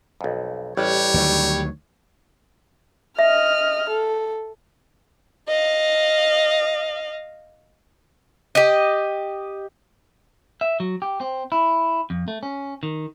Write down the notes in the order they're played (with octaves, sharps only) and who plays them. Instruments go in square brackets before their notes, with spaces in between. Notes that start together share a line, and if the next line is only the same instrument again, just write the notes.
[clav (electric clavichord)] B1 F2
[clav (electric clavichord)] A1 [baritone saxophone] G3 [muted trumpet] C#5
[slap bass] D2 D#3 F#3
[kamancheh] D#5 F6 [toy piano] E5
[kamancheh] A4
[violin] D#5 F5
[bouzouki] G4 D#5
[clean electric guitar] E5
F#3
G4
C4
E4
F2
A3
C#4
D#3